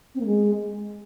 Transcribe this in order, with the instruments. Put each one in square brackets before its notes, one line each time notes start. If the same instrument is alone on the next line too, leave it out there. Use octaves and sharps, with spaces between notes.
[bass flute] C4
A#3
G#3